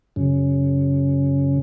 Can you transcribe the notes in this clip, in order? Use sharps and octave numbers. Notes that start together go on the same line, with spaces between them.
F#2 C#3